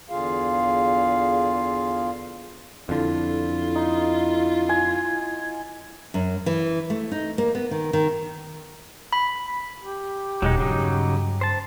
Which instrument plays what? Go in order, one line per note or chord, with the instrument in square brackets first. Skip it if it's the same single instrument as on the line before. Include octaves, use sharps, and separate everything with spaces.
[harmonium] E2 D3 F4 G#4 F5
[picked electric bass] F2 D3 [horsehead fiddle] E4 [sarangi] F4
[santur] D#4
G#5
[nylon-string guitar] F#2
E3
A3
D#4
A#3
B3
D#3
D#3
[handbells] B5
[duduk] G4
[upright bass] D#1 [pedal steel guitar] F#3 G#3 D#4
[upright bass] G2 [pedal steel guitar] C#3 F#3 D#4
[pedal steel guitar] C5 A5